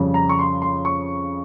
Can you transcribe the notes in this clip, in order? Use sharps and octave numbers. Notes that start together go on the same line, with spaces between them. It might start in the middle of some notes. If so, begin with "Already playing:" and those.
Already playing: F2 C#3 G3
A#5
C#6
C6
C6
C#6